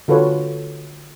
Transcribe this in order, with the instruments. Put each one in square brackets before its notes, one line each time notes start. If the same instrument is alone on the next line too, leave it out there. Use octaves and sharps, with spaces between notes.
[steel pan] D3 F4 F#4 A4 B4 C#5